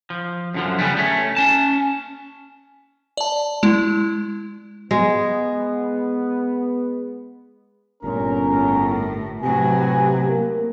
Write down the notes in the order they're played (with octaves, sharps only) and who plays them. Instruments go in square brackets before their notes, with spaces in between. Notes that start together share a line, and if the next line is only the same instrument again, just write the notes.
[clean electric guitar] F3
F#2 D3 F3
C#3 G3 B3
A3 C#4
C#4 A5
[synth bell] D5 A5
G#3 E4
[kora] G#3 [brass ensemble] B3
[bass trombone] G1 [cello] A#2 [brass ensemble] C#4 A#4
[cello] A2
[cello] A2 F#3 [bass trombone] C3 [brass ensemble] G4 B4 G#5
[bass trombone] A#3